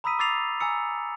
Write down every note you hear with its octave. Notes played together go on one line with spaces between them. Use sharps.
A#5 B5 D#6 E6 B6 D#7
D6 E6 A6 C7 F7
G#5 A#5 E6 C#7